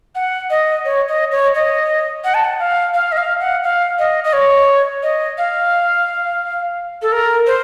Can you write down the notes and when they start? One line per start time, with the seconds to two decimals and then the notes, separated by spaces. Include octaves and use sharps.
0.15 F#5
0.50 D#5
0.85 C#5
1.08 D#5
1.32 C#5
1.55 D#5
2.24 F#5
2.34 A5
2.44 F#5
2.59 F5
2.94 F5
3.12 D#5
3.17 F5
3.40 F#5
3.63 F5
3.99 D#5
4.24 D#5
4.33 C#5
5.03 D#5
5.38 F5
7.02 A4
7.12 A#4
7.47 C5